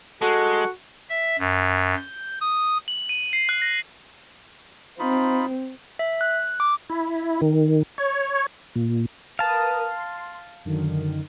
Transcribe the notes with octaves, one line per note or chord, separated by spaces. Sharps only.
G#3 F#4 A4
E5
F#2
G6
D#6
F#7
D#7
C7
F#6
A#6
C4 D#4 F4 B5
E5
F#6
D6
E4
D#3
C#5
A#2
A#4 B4 F5 A5 D#6
C6
F#2 D3 D#3